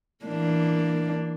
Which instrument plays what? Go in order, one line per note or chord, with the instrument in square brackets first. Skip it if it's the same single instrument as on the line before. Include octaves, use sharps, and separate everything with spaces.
[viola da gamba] E3 A#3 D4